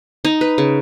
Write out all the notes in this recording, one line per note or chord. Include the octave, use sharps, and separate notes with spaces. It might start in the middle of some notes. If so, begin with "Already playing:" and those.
D#4
B4
C#3